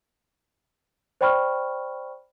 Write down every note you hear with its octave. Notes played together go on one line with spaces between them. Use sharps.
C5 D5 G5 B5 C#6 F6